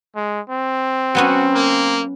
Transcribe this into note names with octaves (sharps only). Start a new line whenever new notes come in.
G#3
C4
F#3 B3 C#4 F#4
A#3